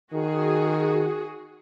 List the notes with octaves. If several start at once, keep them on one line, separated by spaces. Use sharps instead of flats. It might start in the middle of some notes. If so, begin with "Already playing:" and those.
D#3 F#4 G#4